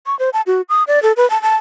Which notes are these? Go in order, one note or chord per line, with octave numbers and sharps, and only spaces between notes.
C#6
C5
A5
F#4
D#6
D5
A4
B4
A5
A5